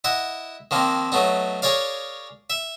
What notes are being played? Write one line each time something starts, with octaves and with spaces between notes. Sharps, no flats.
E4 D#5 F#5
D#3 F3 A#3 C4
F#3 A3 B3 D#4
G#4 A#4 C#5 D5 F5
E5